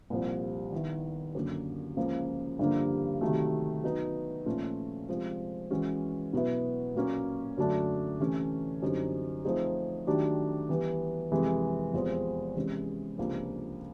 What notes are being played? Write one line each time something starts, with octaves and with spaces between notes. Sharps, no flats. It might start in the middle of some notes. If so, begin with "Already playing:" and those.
C2 A#2 F3
D#3 G3 B3 E4
F#2 D3 F#3 A#3
C#2 C#3 F3 A#3
G2 D3 F3 A#3
C3 D#3 F#3 A3
F#3 B3 D#4
A#2 F3 A3 C#4 F4
C3 F3 G#3 C4
E3 G#3 C#4 F#4
B2 F#3 B3 E4
A#2 F#3 A#3 C#4
F#2 D3 F#3 A3 D4
C3 E3 A3 C#4
F#2 D3 G3 C4 D#4
F3 A3 C4 D#4 G#4
D#3 F#3 A3 D4 G4
E3 G3 B3
F2 C3 E3 G#3
E2 C3 F3 G#3 C4
C3 E3 G#3 C#4
C#2 C3 F3 A#3 D4